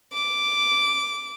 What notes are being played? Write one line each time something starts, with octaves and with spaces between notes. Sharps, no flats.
D6